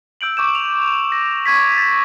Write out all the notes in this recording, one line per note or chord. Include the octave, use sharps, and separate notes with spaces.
E6 G6 D7 F#7
C#6 D6 G6 E7
F7
A#6
C#6 G#6 B6
A6